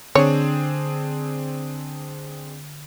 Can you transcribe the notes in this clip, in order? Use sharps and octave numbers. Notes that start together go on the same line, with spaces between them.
D3 C4 D4 G#4 C#5